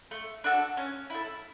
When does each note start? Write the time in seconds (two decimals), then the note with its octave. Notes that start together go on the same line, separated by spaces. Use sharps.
0.11 A3
0.44 D4 F#4 A4
0.77 C#4
1.10 E4 A4